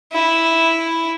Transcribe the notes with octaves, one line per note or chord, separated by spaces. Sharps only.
E4